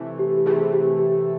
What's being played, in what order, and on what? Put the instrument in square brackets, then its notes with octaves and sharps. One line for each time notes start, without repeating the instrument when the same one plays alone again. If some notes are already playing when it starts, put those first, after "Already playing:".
Already playing: [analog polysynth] C3 E3 A3
[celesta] G4
G4
[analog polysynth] C3 E3 A3 [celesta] G#4
[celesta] G4
G4